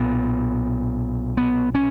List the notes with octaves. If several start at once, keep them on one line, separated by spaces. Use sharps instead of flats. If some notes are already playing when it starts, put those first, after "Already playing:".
Already playing: B1 A#2 B3
B3
C#4